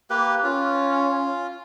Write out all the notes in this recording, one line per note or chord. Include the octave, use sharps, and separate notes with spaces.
A#3 G4 B4
C#4 F4